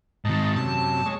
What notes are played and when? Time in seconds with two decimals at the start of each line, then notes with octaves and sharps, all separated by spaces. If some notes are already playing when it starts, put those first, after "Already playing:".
0.25 G#2 D#3 D#4 A5
0.56 F#2 C3 A5
1.06 G#3 C#5